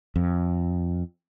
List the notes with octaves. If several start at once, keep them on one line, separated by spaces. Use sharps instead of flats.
F2